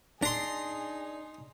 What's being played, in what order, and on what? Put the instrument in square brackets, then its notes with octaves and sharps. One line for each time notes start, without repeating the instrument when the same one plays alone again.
[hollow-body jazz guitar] D4 [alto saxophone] D#4 [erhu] G#4 [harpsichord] A#5 C6